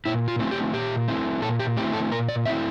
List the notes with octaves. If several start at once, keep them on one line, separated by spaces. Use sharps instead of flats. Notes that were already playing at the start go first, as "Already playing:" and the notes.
A#2 E4
F4
A3 C4 E4
G4
A#2 G4
A3 C4 E4
A#2 A4
G4
A3 C4 E4 G4
A4
A#2 A#4
D5
A3 C4 E4 E5